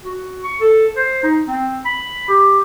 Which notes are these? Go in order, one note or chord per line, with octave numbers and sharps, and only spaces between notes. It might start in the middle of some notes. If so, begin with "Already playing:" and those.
F#4
C#6
A4
C5
D#4
C4
B5
G4